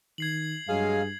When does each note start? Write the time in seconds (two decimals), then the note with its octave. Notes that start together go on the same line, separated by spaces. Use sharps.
0.18 D#3 G#6 C7 F#7
0.68 G2 F#3 G#3 G#4 F5